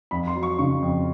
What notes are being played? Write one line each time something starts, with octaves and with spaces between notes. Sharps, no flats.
F2 B5
C6
F#3
C#6
C#3 C#6
F2